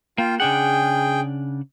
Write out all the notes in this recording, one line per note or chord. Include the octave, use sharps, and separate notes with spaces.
A#3 F4 G5
C#3 D4 G#4 F#5 G5